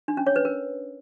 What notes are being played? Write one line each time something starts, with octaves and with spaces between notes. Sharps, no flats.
D4
C#4
C#5
B4
A#4